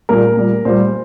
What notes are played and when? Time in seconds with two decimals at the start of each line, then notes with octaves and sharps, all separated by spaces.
0.09 A#2 G3 A#4
0.37 A#2 G3
0.65 A#2 G3 C5